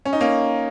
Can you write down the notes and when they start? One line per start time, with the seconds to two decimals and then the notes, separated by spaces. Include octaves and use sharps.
0.05 C#4
0.13 D#4
0.21 A#3 C#4